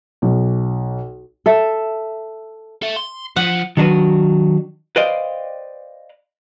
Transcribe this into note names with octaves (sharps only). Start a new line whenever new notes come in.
B1
A4 E5
A4 E5
C6
F3 F#5
D#3 F#3 D4 F#4 B4
B4 C5 D5 D#5 F5 G5